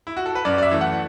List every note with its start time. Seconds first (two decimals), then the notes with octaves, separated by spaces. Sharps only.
0.07 E4
0.17 F#4
0.26 A4
0.35 B4
0.45 F#2 D5
0.58 D5
0.63 E5
0.71 E3 A3
0.81 F#5